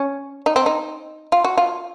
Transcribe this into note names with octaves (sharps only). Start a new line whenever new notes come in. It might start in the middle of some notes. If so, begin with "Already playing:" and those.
Already playing: C#4
D#4
C4
D#4
F4
F#4
F4